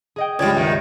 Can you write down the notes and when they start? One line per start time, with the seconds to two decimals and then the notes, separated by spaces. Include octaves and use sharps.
0.16 G#4 D#5 G5
0.39 C#2 G2 G3 D5 G#6 A6
0.55 F#2 D#3